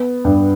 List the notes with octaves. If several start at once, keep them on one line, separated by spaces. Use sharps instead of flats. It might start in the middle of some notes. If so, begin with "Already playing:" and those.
Already playing: B3
G2